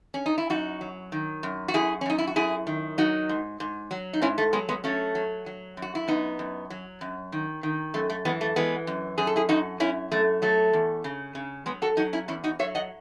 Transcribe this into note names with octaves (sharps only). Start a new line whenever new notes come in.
C#4
D#4
E4
F#2 D#4 F#4
F#3
D#3
F#2
F#4
F#2 E4 G#4
C#4
F#2 D#4
E4
F#4
F#2 E4 G#4
D#3
F#3 D#4 F#4
G#2
G#2
F#3
D#4
G#2 C#4 E4
A3
F#3 G#3 B3
G#3 B3
F#3 A3 C#4
F#3
F#3
F#2
F#4
E4
F#2 B3 D#4
F#2
F#3
F#2
D#3
D#3
F#2 A3
A3
E3 G#3 B3
A3
E3 G#3 B3
F#2
F#2 G#4
A4
E4 G#4
F#2 D#4 F#4
F#2 C#4 E4
F#2 A3
F#3 A3
E2
C#3
C#3
F#3 G#3 B3
F#4 A4
F#3 D#4 F#4
C#4 E4
E2 C#4 E4
D#4 F#4
F#3 C#5 E5
D#5 F#5